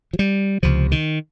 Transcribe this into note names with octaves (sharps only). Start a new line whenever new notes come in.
F3
G3
C#2 C3 F3
D#3